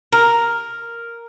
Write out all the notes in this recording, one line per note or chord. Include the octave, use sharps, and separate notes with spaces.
A#4